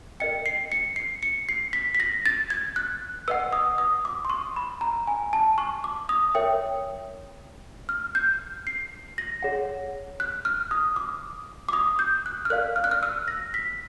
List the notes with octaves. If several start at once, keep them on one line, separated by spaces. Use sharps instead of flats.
A#4 D#5 G5 C#7
C7
C#7
C7
C#7
C7
B6
B6
A#6
A6
G#6
F#6
B4 D#5 F#5 E6
D#6
D#6
D6
C6
C#6
B5
A#5
G#5
A5
C#6
D6
D#6
A#4 C#5 E5 G5
F6
G6
C7
A#6
G#4 C#5 F#5
F#6
F6
D#6
D6
D6
D#6
G6
F#6
F6
A#4 D5 F5 F#6
F6
F#6
F6
E6
A#6
B6